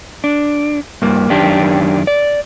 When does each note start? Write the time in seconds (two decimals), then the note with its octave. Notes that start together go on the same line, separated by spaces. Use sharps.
0.24 D4
1.02 G2 A#3
1.30 F#2 D#3 D4 G4
2.07 D5